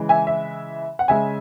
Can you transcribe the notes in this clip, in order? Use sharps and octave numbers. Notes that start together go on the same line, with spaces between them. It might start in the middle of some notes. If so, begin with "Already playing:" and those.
Already playing: C#3 E3 G#3
E5 G#5
E5
F#5
C#3 G#3 E5 G#5